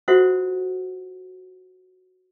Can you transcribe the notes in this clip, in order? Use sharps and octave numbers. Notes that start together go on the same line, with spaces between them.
F4 F#4 A4 C5 E5 F#5